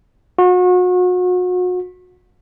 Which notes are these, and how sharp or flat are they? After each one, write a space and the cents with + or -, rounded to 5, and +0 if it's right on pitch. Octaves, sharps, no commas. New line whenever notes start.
F#4 -35